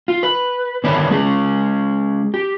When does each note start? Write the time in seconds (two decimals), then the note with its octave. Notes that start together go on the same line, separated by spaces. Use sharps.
0.08 F4
0.23 B4
0.84 D3 D#3 D4 E4 B4 C#5
1.10 G#3 C#4 G#4
2.34 G4